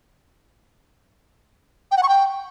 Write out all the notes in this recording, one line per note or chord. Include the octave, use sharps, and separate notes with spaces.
G5
F#5
C#6
G5